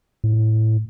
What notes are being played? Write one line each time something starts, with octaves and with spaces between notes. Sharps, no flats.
A2